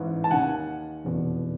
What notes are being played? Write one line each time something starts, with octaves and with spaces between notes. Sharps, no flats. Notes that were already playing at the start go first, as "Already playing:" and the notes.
Already playing: A1 G#2 E3
A5
D#2 D#3 F#5 G#5
F1 E2 B2